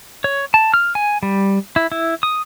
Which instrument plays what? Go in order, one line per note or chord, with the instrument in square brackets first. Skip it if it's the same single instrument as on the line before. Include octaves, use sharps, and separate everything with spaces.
[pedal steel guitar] C#5
A5
F6
G#5
G3
E4
E4
D#6